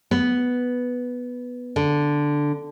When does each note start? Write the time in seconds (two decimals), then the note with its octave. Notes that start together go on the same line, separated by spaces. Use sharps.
0.11 B3
1.76 D3